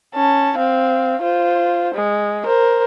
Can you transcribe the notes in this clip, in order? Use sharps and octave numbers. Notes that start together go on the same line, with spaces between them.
C#4 A5
C4 F5
F4 C5
G#3
A#4 C5